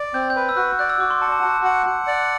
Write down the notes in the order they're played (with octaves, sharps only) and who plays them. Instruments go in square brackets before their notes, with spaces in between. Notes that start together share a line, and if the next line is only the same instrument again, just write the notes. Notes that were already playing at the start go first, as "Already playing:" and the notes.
Already playing: [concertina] D5
[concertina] C4 [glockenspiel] G6
[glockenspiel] G6
[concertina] B4
[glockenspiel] E6
[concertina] F#4 [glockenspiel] F#6
[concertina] D5 [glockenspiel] F#6
[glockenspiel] E6
[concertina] F#4 [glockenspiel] D6
[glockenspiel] C6
[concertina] F#5 [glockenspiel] A5
[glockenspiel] A5
[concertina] F#4 [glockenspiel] A5
[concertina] F#5
F#5
D5